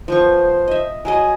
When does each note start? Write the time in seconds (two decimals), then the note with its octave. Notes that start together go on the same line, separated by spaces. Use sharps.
0.08 F3 B3 C5 C#6
0.68 D#5 E5
1.05 F#3 G#4 D#5 G#5